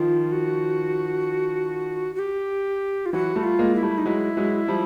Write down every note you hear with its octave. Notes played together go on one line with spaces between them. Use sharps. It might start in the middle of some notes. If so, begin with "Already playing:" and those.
Already playing: D#3 F3 F4
F#4
F#4
G4
F4
E3 F#3 F#4
G3 A3
F4
G#3 A#3
E4
G3 A3
D#4
F#3 G#3 E4
F#3 G#3
F3 G3